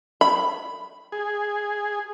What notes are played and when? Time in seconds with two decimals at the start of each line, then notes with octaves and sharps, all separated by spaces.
0.21 B5
1.12 G#4